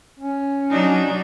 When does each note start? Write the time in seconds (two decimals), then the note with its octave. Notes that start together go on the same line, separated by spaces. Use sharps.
0.20 C#4
0.70 F#3 D4 D#4